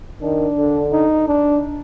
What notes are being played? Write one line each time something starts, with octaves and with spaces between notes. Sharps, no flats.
D#3 D4
D3
D#4
D4